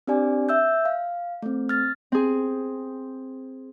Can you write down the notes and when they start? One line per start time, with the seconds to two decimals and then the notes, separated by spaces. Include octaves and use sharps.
0.07 C4 D4 G4 D5 G#5
0.49 E5 E6 G6
0.85 F5
1.42 A3 C4
1.69 F6 A6
2.12 C4 G#4